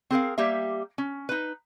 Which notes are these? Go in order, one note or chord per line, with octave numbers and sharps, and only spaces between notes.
C4 G#4 A#4 F5
G3 A#3 G4 E5
C#4
D#4 B4